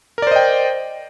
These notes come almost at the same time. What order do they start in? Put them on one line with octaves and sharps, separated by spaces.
A#4 D5 C5 D#5 G5